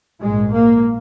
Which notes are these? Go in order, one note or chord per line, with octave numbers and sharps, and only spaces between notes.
A#1 G#2 G#3
A#3